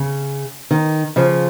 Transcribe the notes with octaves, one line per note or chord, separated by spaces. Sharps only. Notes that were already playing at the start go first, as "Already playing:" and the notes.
Already playing: C#3
D#3
C#3 F3